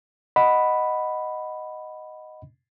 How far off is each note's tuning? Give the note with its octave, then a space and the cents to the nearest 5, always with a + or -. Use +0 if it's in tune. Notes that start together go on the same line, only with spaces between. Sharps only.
D#5 +0 F#5 +0 B5 +0